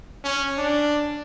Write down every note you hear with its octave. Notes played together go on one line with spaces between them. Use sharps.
C#4
D4